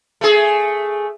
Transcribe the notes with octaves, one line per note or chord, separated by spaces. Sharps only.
A3 G#4